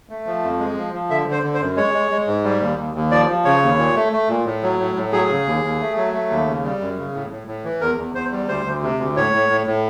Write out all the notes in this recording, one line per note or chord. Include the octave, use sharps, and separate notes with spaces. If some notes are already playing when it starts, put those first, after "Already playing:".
A3
F3
F2
G#3
F3
F3
D3 E5
D3 C5
D3
C5
F#2
G#3 C#5
G#3
G#3
G#2
G3
D#2
D#2
D#2
F3 D5
F3
C#3 C#5
D#2
A#2
A3
A3
A#2
A2
F#3
A2
A2
F#3 G#4
C#3
D#2
D#2
A3
F#3
A3
D#2
C#3
G3
F#2
C#3
A2
A2
A2
E3
E2 A#4
E2
E2 C5
G3
D2 C5
D2
C3
D2
A2 C#5
A2
A2
A2